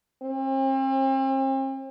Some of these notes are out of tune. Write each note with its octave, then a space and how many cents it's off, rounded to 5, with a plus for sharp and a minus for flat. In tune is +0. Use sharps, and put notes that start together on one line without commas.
C4 +40